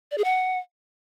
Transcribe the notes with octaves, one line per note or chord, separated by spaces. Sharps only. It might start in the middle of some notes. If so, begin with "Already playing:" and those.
D5
G#4
F#5